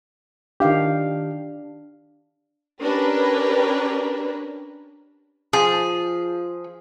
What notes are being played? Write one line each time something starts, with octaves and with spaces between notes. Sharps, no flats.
D#3 D4 G4 F5
C#4 D4 G4 A#4 B4
F3 G#4